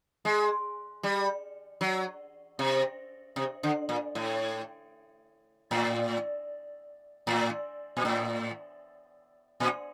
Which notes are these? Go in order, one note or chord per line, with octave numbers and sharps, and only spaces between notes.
G#3
G3
F#3
C3
C3
D3
A#2
A2
A2
A2
A#2
A2
A#2